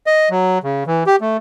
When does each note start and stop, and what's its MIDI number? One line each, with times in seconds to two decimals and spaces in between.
0.06 0.29 75
0.30 0.58 54
0.63 0.84 49
0.87 1.03 52
1.07 1.16 67
1.21 1.37 57